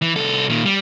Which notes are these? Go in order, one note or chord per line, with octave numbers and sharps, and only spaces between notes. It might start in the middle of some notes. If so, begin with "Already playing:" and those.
E3
C2 A4
A#2 D#3
G3